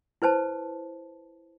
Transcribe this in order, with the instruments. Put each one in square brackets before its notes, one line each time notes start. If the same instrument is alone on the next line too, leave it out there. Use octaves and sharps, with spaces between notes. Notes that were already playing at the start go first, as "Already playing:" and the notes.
[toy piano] E4 B4 C5 A5